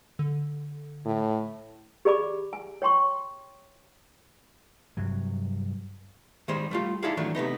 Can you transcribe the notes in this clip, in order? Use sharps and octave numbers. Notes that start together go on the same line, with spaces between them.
D3
A2
G4 G#4 D5 B5 D6
G#5
C#5 G5 C6 C#6
G2 C3 F#3
D#3 G3 G#3 C5
G3 A3 F4
D#4 E4 G#4 A4 D5 F5
D#3 E3 F#3 A3 D4
C3 A3 B3 D#4